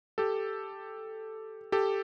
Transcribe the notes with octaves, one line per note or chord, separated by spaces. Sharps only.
G4 A4
G4 A4